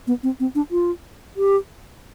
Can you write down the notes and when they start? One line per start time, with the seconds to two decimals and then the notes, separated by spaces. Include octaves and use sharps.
0.07 B3
0.23 C4
0.40 C4
0.55 D4
0.71 F4
1.37 G4